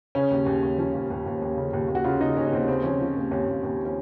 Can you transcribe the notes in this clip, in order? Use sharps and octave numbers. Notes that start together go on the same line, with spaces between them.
C#3 C#4
D#2
D#2
D#2
F3 C#4
D#2
D#2
D#2
D#2
C#3
D#2
D#2
F#4
C#3 F4
C#3 D#4
D#2 C#4
C#4
D#2 C4
C#3 C4
F3 C#4
F3
D#2
D#2 C#4
D#2
D#2
C#4